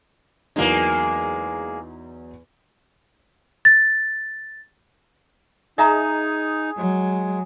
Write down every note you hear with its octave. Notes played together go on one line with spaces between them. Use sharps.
E2 F#3 G#3 A#3 D#4
A6
D#4 G#4 D#5 E5 A#5
F#3 G#3